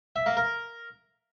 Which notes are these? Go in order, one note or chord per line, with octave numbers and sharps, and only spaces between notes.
E5
A#3
A#4